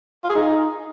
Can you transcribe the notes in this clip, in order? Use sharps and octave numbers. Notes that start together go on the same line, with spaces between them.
F4
G#4
D#4